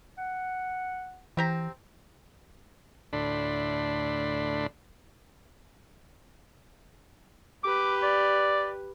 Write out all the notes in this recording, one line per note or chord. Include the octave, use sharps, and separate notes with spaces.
F#5
E3 C4 G4 A#5
D2 A2 D4 B5 C6
G4 B4 D6
D5